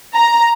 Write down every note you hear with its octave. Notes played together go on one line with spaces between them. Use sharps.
A#5